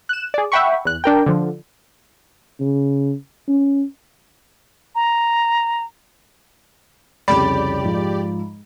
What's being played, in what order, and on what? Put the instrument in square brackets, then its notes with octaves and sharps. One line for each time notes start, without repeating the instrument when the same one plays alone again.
[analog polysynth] F#6 E7
G#4 D5
E5 F#5 G5 B5 C#6
E2 F#6
D4 A#4 G5
D3 F3
[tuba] C#3
C#4
[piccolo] A#5
[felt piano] C2 F2 C#3 [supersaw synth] G4 D5 [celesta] B5
[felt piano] G#2 F3